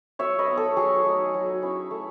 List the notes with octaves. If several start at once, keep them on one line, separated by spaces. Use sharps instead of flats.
F#3 C#5 E5
B4 D#5
B3 D#4
A4 C#5
F#3 G#4
A3 D#4
F#3
C#4 E4
A3